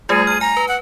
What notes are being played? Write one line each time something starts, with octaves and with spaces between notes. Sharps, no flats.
G3 A3 F4 G#4
F6 D#7
G#5 A#5
B4
F#5